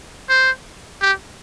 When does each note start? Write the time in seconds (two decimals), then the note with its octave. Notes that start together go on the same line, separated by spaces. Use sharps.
0.29 C5
1.01 G4